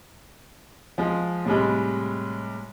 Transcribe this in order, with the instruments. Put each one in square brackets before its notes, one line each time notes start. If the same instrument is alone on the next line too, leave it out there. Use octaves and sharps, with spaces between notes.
[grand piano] F3 G#3
A2 C3 G3 G#3